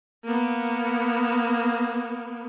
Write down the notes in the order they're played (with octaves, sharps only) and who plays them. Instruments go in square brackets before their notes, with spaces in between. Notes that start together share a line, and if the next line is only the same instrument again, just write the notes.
[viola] A#3 B3